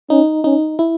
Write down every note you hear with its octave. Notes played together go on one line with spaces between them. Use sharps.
C#4 D#4
C#4 D#4
E4